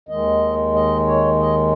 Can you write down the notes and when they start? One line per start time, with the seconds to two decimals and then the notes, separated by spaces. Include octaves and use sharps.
0.09 D#2 D#3 G#3 D#5
0.74 D#5
1.06 C#5
1.40 D#5